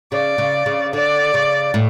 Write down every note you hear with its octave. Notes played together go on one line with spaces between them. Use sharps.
C#3 D5
C#3
C#3
D3 D5
C#3
A2